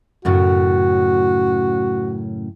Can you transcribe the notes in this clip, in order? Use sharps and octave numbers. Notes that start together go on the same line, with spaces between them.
F#2 A2 C#3 F#4